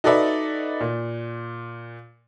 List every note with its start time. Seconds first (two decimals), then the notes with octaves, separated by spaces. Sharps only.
0.04 D#4 F#4 A4 B4 D5 E5
0.81 A#2